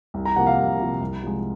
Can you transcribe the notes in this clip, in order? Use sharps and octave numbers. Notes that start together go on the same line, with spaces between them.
C2
A#5
C3 F3 A#3 F#5
F5
C2
C3 F3 A#3
C2
C3 F3 G#3